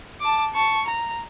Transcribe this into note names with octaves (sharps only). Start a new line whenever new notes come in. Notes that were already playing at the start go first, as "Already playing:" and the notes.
A5 D6
A5 C#6
A#5